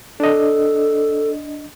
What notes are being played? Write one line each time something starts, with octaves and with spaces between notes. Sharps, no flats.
D4 A4 D#5